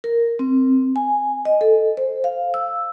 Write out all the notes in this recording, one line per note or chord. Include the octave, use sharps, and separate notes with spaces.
A#4
C4
G#5
D#5
A4
C5
F5
E6